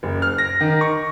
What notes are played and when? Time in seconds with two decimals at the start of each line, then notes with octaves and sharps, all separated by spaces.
0.03 F#1
0.22 F6
0.38 A#6
0.61 D#3
0.81 C#6